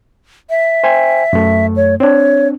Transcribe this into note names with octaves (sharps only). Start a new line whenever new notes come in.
E5
C5 G5 G#5
F#2 A3
C#5
C4 D4 C#5